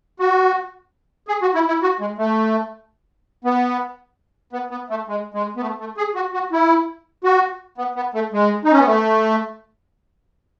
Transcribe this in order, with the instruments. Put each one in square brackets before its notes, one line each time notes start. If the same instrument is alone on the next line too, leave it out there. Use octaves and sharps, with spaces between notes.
[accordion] F#4
G#4
F#4
E4
E4
F#4
G#3
A3
B3
B3
B3
A3
G#3
G#3
B3
A3
A3
G#4
F#4
F#4
E4
F#4
B3
B3
A3
G#3
D#4
C#4
B3
A3